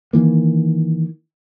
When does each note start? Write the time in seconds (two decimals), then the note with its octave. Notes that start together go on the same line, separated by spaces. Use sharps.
0.13 D#3 E3 A#3